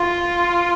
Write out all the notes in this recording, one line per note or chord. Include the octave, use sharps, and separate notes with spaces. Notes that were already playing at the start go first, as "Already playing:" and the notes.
Already playing: F4